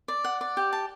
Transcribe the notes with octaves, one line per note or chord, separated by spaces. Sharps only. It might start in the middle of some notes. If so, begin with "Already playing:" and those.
D5
F#5
D5
G4
A5